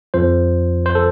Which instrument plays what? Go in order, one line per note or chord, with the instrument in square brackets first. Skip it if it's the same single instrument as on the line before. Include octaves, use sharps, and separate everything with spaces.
[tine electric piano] F2 F3 C5
C5
A4